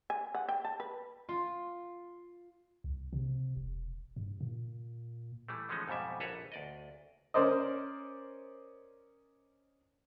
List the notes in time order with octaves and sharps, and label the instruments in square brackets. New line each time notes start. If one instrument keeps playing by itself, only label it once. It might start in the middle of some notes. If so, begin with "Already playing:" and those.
[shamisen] G#5
F#5
G5
A5
B4
[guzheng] F4
[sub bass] C2
C3
E1
G2
A#2
[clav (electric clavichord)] E3 G3 A3
E3 F3 G#3 A3 C#4 D#4
F2 G#2 B2 G3 E5
A#1 A4 B4 C#5 A#5
D2 D5 D#5
[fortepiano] C#4 A#4 C5 D5 D#5